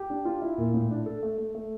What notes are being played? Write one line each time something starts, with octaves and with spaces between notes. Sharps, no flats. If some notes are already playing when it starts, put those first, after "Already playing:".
Already playing: G4
D4
F4
E4
A#2
A2
D4
A4
A3
A3
A3